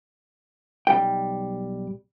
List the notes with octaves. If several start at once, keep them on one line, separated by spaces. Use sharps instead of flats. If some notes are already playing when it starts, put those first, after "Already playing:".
B1 G3 G5